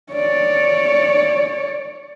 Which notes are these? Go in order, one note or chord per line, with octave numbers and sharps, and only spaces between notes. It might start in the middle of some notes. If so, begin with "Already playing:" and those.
C#5 D5